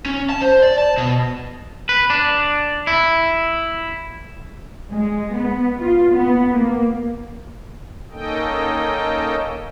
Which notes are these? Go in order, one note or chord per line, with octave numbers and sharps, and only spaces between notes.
C#4
A5
C5
D5
A5
B2
B4
D4
E4
G#3
B3
F4
B3
A#3
A#3 C#4 D#4 A4 D#5 G5